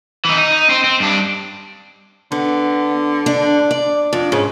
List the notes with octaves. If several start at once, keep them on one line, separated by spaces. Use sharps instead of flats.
E3 D#4
D#4
D#4
C4
C4
G2 D4
D3 B3
D4
D5
F2 D4
G#2 C#3